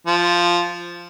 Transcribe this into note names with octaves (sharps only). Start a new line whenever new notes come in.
F3